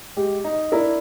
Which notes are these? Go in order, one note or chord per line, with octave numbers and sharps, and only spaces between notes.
G#3 G4
D#4
D4 E4 A#4